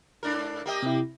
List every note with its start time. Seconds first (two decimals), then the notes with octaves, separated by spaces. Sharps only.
0.23 G#2 D4 A#4
0.66 A#3 G4 D#5
0.83 C3 E4